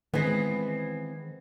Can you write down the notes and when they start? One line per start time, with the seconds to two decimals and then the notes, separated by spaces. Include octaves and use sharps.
0.14 D#3 E3 G#3 B3 C4